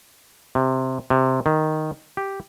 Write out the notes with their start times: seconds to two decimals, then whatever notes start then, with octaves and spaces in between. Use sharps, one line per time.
0.55 C3
1.10 C3
1.46 D#3
2.17 G4